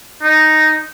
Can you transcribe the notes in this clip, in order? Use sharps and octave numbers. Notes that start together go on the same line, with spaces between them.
D#4